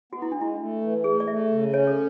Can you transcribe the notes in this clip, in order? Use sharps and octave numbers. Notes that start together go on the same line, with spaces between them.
B3 F#4
E4
G#3 D4
E4
A3
E3
A3 G#4
D5
A3 E5
C#3
C#4 C#5
A4